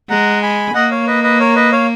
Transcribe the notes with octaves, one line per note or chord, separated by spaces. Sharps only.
G#3 F#5 A#5
G#5 B5
A#3 D#5 F#5
C#5 F5
B4 D#5
B4 D#5
A#4 C#5
B4 D#5
C#5 F5